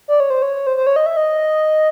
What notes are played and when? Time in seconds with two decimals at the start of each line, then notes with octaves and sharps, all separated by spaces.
0.08 D5
0.20 C#5
0.30 C5
0.42 C#5
0.67 C5
0.77 C5
0.87 C#5
0.96 D#5
1.06 E5
1.17 D#5